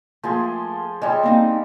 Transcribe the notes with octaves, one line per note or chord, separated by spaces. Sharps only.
F3 A3 A#3 G#4 C6
G3 G#3 C#5 A5
A#3 C4 D#4